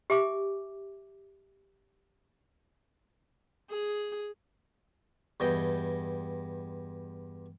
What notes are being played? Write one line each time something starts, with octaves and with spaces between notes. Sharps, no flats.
G4 E5 G#5 D6
G#4
E2 G2 D#5 G5